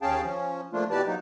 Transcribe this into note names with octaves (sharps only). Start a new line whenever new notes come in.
D#2 C#4 G#4 F5 G5 A5
F3 C#4
F3 A3 A#3 D4 F4
B2 E3 G4 B4 D5 A5
F#3 A#3 D#4